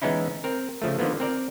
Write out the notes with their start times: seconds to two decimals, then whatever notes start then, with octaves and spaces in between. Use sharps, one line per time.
0.02 E3 G#3 B3 C#4 D#4 E4
0.44 C4 A#4
0.82 C#3 F3 A3
0.99 D3 D#3 F3 A#3 B3
1.20 C4 A#4 D5